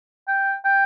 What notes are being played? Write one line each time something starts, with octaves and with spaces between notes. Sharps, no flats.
G5
G5